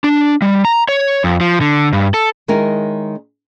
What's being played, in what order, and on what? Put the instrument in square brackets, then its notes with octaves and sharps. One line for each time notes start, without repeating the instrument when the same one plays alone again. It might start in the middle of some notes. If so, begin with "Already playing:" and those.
[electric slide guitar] D4
G3
A#5
C#5
F2
F3
D3
G2
A4
[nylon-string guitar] D#3 G#3 C#4 E4 A#4